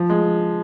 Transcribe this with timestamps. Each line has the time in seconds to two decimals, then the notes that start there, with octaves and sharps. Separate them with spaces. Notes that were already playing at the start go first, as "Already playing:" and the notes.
Already playing: F3
0.10 G#3